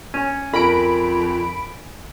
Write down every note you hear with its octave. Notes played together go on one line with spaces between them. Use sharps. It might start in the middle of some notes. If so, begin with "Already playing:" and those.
C#4
F2 A#4 B5 D7